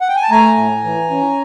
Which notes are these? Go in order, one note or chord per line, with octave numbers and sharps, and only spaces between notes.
F#5
G5
G#5
A5
A3 G#5 A#5
A2
E3
C#4